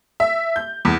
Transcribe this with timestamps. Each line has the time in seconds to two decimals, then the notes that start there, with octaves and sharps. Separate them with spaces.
0.20 E5
0.56 G6
0.85 E2